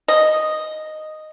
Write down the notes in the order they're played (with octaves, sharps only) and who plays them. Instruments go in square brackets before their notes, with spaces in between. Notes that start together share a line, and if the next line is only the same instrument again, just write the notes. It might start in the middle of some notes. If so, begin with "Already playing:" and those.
[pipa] D#5